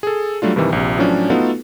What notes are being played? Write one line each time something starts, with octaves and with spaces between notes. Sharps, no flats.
G#4 A4
F#3 G3 A3 D4 F4
G2 C3 D#3 E3
A#1 C3
A2 F3 F#3 C#4 D4
A3 B3 D#4 F4 F#4 A4